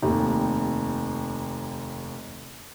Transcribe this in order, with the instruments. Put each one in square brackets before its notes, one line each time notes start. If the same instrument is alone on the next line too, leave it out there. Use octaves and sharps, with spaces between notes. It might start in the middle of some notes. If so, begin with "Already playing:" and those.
[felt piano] F1 D#2 G4